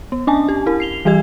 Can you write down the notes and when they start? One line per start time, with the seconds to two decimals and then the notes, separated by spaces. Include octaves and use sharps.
0.12 B3
0.27 C#4 D4 G#5 A5
0.49 G4
0.66 E4 A#4
0.80 C7 F7 G7
1.05 E3 G3 G4 D#5 G#6